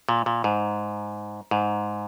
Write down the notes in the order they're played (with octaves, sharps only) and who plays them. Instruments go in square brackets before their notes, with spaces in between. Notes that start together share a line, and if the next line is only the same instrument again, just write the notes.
[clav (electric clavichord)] A#2
A#2
G#2
G#2